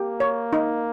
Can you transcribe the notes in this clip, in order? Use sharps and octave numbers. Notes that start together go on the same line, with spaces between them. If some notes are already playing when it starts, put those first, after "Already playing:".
Already playing: A#3 G4
C#5
D#4